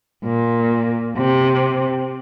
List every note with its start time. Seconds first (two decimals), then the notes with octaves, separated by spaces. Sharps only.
0.24 A#2
1.17 C3